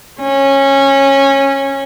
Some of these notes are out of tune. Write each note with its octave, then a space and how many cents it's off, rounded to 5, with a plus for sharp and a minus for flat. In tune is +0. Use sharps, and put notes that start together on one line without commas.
C#4 -15